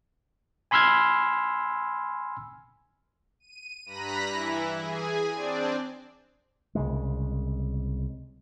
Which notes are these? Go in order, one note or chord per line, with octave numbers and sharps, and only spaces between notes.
G#5 B5 C6 E6 F6 G#6
D#7
G2 A#5 B5 F#6 A#6 B6
E3 E4
G#4 G#5
C4 D4 D5
C2 C#3 G#3